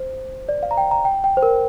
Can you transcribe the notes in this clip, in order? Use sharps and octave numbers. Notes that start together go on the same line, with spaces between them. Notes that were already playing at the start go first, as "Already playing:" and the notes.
Already playing: C5
D5
F5
A#5
G5
A#5
G5
G5
C5
A#4